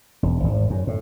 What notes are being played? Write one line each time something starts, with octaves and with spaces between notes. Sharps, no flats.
E1
G#1
F#2
A2